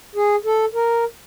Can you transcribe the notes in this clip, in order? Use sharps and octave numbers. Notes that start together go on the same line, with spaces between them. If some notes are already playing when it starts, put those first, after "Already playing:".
G#4
A4
A#4